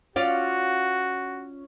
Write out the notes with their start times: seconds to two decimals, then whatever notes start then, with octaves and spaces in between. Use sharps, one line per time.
0.16 C#4 F4 F#4 D5